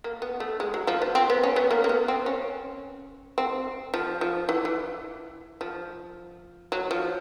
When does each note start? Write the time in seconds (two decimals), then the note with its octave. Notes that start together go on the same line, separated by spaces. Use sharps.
0.04 A#3
0.22 B3
0.40 A3
0.60 G#3
0.74 F#3
0.87 F3
1.02 B3
1.15 C4
1.30 B3
1.44 C#4
1.56 B3
1.71 A#3
1.84 A#3
1.89 B3
2.08 C4
2.26 C#4
3.38 C4
3.94 F3
4.21 F3
4.49 E3
4.65 E3
5.61 F3
6.72 F#3
6.91 F3